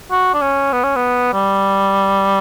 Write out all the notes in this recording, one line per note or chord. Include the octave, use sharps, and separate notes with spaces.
F#4
D4
C#4
B3
C#4
B3
G3